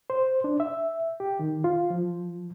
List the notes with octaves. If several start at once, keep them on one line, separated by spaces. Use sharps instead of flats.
C5
D4
E5
G4
D#3
F4
F3